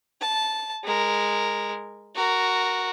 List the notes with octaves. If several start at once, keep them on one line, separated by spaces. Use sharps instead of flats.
A5
G#3 A#4
F#4 A#4